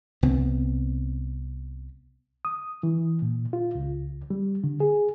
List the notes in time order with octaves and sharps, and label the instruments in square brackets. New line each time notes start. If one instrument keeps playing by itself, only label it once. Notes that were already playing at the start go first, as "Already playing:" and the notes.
[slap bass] C2 B3 C4
[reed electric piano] D#6
E3
A#2
F4
C#2
G3
D3
G#4